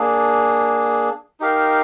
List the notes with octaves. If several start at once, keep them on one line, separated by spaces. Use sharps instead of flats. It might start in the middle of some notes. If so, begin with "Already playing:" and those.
Already playing: A#3 D4 G#4
D#4 G4 A#4 F5